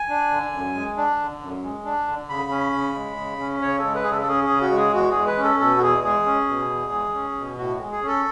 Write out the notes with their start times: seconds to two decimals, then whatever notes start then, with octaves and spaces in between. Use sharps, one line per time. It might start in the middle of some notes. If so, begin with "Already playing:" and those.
Already playing: G#5
0.09 D4
0.31 D3
0.53 F#2
0.75 G#3
0.97 D4
1.19 D3
1.41 F#2
1.63 G#3
1.85 D4
2.08 D3
2.29 C#3 B5
2.51 C#4
2.73 C#3
2.95 G#3
3.17 C#3
3.40 C#4
3.61 C#3 C#5
3.78 G#3 A4
3.95 B4
4.04 C#3 G#4
4.11 A4
4.21 A4
4.27 C#4 G#4
4.44 G#4
4.50 C#3
4.61 F#4
4.72 G#3
4.77 G#4
4.93 E2 F#4
5.10 G#4
5.16 G#3
5.27 B4
5.38 C#4
5.43 A4
5.60 B2 A4
5.77 F#4
5.82 E2 G#4
6.04 G#3 G#4
6.26 C#4
6.48 B2
6.70 E2
6.92 G#3
7.14 C#4
7.36 B2
7.58 A2 F#4
7.80 G#3
7.92 G#4
8.02 C#4
8.08 A4